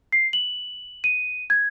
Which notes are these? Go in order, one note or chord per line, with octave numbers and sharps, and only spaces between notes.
C7
F#7
D#7
G#6